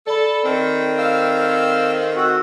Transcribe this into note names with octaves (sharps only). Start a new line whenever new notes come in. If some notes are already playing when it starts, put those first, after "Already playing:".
A4 D5 B5
D#3 A3 C4
F5 E6
F#4 G5 E6